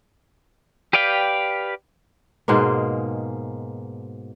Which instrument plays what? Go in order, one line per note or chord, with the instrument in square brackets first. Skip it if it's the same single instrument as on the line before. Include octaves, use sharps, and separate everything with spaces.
[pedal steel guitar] G4 B4 D5 F5 G5
[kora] G#2 B2 G#3 A#3